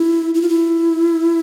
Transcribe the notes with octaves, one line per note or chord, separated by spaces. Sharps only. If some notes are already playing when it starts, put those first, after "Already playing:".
Already playing: E4
E4
F4
E4